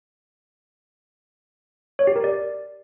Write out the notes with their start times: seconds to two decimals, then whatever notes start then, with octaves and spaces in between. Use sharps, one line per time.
1.99 C#5
2.07 G4
2.16 A#4
2.24 D5